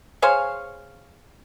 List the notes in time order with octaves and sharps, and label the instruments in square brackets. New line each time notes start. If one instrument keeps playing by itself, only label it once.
[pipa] G#4 C5 C#5 F5